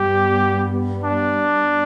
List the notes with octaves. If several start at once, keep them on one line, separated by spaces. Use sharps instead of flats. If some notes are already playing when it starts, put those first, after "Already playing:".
Already playing: G2 G3 B3 G4
D4